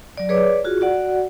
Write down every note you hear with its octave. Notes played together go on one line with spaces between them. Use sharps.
F#3 D5
G#4 B4 C#5 D5 D6
F4 F#4 G#4
F#4 D5 F#5